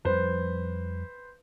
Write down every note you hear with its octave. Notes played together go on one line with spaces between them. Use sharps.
F2 F3 G3 B4 C5